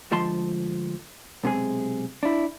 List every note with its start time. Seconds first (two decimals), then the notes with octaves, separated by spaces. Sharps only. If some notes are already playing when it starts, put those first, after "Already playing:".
0.11 D2 F3 G#3 A5 C6
1.44 B1 C3 G#3 G#4
2.23 D4 E4